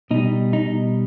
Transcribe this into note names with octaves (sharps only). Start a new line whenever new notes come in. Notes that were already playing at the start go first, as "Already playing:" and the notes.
B2 G3 D#4
D#4